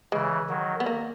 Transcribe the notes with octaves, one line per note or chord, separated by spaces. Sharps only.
C#3 E3 G#3
D#3 F#3
B3
A#3